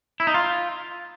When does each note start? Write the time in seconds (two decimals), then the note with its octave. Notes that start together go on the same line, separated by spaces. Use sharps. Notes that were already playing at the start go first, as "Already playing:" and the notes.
0.20 E4
0.27 D#4
0.34 F4